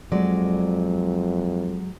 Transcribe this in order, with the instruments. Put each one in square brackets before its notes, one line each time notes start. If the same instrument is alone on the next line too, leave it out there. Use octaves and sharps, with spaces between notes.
[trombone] F2 [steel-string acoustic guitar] F#3 G#3 D5